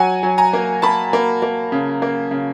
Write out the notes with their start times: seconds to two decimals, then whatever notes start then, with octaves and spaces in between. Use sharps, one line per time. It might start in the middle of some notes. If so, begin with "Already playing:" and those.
Already playing: F#3 F#5 G#5
0.23 F#3
0.38 G#5 A#5
0.53 A#3
0.82 A#3 A5 B5
1.13 A#3
1.42 A#3
1.72 C#3
2.02 A#3
2.31 C#3